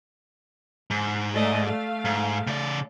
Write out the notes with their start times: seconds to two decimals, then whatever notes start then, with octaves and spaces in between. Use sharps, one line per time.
0.91 G#2
1.33 A3 D5 D#5
1.66 A3 F5
2.05 G#2
2.47 C#3 D5